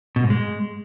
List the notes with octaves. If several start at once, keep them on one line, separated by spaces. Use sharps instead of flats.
B2
G#2
G#3